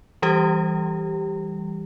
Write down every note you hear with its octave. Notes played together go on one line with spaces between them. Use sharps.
E3 G3 G4